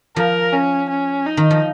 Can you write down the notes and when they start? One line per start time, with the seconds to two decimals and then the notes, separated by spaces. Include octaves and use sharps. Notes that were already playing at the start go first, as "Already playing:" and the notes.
0.16 F3 A#4
0.53 C#4
0.90 C#4
1.26 D#4
1.37 D#3
1.51 F3